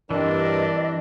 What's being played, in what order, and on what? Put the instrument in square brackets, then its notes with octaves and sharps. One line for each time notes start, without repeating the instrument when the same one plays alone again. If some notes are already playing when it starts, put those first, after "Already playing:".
[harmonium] G2 G3 A#4 [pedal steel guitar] E3 C4 [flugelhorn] D4 [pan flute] D#5